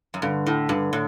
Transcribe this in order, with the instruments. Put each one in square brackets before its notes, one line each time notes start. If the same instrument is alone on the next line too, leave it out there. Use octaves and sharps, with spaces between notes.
[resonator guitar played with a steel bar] F#2
[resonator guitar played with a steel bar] G2 [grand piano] D3
[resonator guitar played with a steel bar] A2
[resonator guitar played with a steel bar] G2 [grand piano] D3
[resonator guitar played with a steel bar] A2